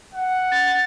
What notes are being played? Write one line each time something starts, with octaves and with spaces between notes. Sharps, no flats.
F#5
A6